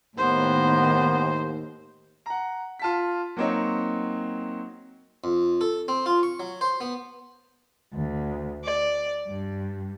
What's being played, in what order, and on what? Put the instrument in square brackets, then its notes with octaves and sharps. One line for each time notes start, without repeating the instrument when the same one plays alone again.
[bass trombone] D#2 [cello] A2 D#3 [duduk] B3 [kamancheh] C5
[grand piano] F#5 A#5
F4 A5 B6
F#3 A#3 C4 D#4 C#5
[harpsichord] F2
A4
C4
F4
C#6
F#3
C5
B3
[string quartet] D2
D5
G2